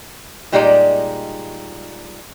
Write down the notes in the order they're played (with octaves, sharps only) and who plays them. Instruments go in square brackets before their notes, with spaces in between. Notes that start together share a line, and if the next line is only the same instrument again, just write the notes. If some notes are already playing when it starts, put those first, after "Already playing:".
[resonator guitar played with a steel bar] A#2 G3 G#3 D#4 F4 D5